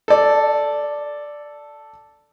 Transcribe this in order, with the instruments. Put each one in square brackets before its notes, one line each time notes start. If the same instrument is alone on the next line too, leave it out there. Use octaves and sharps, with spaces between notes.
[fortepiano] A4 D5